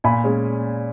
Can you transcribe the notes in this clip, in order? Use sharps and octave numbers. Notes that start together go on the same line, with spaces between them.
A#2 G#5 B5
G#3 C#4